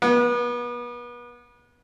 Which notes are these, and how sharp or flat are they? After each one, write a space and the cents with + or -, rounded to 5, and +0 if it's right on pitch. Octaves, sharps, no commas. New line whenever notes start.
B3 -35